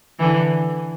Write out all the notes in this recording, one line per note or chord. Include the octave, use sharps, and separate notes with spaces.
D3 E3